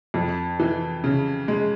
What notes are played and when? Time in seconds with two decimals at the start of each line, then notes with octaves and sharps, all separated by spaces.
0.14 F2
0.60 E3
1.04 C#3
1.48 G#3